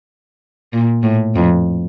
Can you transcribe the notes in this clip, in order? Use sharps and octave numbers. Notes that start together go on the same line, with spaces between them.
A#2
A2
F2